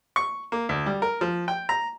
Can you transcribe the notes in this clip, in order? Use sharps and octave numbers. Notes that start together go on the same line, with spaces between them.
C#6
A#3
D2
G3
A#4
F3
G5
A#5